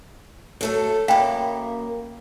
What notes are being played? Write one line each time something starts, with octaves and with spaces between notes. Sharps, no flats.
F#3 A3 A4
F#2 A#3 F5 G5 B5